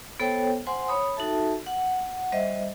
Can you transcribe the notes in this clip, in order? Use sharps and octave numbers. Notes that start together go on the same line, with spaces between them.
B3 A4 C5 C#5 G5
C5 F#5 G#5 C6
C#5 B5 D#6
D#4 F#4 A4 E5 A5
F#5
G3 C5 D#5 E5